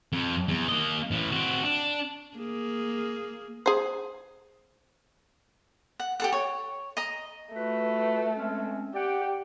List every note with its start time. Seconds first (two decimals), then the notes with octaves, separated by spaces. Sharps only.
0.12 F2
0.48 E2
0.68 A#3 D#5
1.11 A2 E3
1.32 C4 F#4
1.63 D4
2.37 A#3 G#4
3.66 G#4 C5
6.00 F#5
6.20 G4 A4 F#5
6.32 C#5
6.97 D#5 A#5
7.54 A3 F4 F#4 B4
8.36 G#3 C4 C#4
8.94 G4 D5 F#5 G5